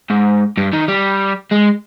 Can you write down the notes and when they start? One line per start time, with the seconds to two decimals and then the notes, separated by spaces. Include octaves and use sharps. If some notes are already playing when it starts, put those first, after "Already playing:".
0.10 G#2
0.57 G2
0.73 D#3
0.88 G3
1.52 G#3